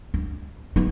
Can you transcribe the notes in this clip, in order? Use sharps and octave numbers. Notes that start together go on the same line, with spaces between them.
D4
B3 D#4